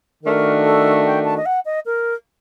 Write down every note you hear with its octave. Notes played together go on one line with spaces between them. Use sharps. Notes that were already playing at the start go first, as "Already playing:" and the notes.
D#3 A3 D4 F#4 A#4
A4
G5
A5
D#5
F#5
D#5
A#4